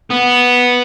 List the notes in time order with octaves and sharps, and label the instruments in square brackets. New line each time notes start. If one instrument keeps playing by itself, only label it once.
[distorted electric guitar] B3